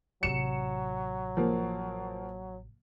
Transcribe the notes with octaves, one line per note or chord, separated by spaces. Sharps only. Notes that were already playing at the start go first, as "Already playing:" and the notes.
A1 C3 F#3 C#7 E7
F3 A#3